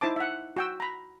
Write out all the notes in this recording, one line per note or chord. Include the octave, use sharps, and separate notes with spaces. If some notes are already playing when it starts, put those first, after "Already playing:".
D#4 E4 C5 A5 D6
E5 F#5
F#4 G5 E6
A#5 B5